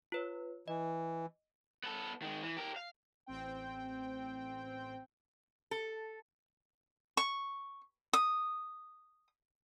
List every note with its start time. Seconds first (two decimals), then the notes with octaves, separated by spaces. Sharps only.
0.12 F4 B4 C#5
0.68 E3 D#5
1.84 B3 A4
2.22 D#3 G#3
2.43 E3
2.57 G4 A#4
2.76 F5
3.26 A1 C4 G5
5.71 A4
7.17 C#6
8.13 D#6